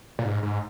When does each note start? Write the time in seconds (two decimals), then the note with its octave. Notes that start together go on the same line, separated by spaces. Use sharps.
0.19 A#2
0.25 G#2
0.43 G#2